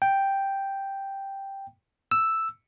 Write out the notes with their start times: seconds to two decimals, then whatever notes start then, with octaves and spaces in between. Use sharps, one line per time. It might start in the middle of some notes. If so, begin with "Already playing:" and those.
0.02 G5
2.11 E6